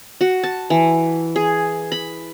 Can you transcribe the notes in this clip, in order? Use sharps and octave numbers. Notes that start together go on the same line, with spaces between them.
F#4
A5
E3
G#4
B5